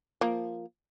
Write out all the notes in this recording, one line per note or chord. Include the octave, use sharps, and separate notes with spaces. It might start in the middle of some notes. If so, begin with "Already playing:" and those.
F3 A#3